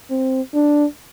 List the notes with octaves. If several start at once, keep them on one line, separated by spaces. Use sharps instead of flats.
C4
D4